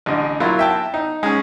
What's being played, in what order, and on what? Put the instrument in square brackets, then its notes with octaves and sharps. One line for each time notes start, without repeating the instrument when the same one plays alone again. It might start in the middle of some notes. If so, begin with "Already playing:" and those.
[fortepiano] A1 D3 D#5
F#3 A#3 E4 F4
E5 G5 A5
D#4
G#3 C#4